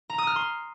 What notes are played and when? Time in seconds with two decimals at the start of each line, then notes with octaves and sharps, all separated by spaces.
0.10 A#5
0.18 D#6
0.27 F6
0.36 C6